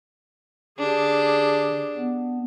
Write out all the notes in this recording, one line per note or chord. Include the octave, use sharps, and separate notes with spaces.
D3 D4 G4 G#4
B3